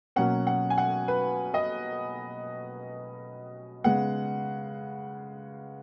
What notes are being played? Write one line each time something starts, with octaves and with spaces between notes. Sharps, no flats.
B2 F#3 A#3 C#4 F#5
F#5
G#5
F#5
B4
D#5
C#3 G#3 B3 F#5